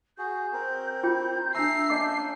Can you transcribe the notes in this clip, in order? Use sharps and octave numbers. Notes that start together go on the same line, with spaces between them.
F#4 G#4 G6
C4 A#4
F4 G5
D4 E5 A5 A#5 E6 C7
C#4 D4 D#5 F5 D6